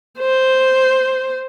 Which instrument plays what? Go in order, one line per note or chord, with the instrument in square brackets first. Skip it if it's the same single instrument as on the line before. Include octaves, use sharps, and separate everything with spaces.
[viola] C5